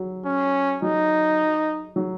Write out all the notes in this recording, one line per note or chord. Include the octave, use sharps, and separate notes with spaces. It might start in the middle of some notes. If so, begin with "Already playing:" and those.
Already playing: F#3
C#4
F#3 D#4
F#3